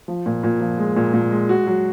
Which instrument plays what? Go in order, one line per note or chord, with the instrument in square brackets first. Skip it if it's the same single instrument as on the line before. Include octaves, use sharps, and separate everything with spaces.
[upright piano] F3
A#2
A#2
F3
G#3
A#2
A#2
G#3
F#4
F#3